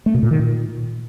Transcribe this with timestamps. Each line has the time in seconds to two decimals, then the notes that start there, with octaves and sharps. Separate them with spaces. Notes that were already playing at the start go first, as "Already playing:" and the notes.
0.06 A3
0.14 B2
0.23 A#2
0.31 D#3
0.39 A#2